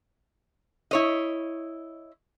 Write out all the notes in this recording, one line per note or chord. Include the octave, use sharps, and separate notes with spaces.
E4 C#5 D#5